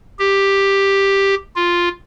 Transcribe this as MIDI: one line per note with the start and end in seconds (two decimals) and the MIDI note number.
0.19 1.35 67
1.56 1.89 65